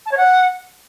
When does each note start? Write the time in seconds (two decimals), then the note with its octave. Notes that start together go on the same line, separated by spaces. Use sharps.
0.06 A5
0.12 C#5
0.17 F#5